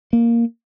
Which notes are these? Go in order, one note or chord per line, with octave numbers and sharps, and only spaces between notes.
A#3